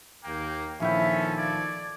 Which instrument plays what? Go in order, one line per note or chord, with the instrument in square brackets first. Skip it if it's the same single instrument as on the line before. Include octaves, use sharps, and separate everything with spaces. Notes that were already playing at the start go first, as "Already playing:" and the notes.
[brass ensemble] D#2 G5 [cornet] A#3
[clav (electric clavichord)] A#1 E4 G5 [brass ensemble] D#3 F3 A4 [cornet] C#4 [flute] E5
[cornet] D5 [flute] G#6